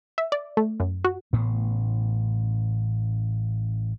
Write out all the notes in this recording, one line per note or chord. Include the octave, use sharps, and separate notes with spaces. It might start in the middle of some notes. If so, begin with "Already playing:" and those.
E5
D5
A3
F#2
F#4
A1 A2 C#3 B3